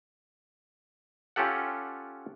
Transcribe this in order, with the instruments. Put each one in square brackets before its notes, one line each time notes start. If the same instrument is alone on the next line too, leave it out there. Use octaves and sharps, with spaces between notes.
[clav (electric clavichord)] C#4 F4 G4 A4 F#5